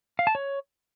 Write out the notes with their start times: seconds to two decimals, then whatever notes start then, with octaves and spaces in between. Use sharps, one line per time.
0.19 F5
0.27 A5
0.35 C#5